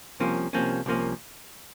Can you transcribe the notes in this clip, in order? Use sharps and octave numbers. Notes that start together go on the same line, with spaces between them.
C2 C3 F3 A#3 C#4
C2 C3 F3 A#3 C#4
C2 C3 F3 A#3 C#4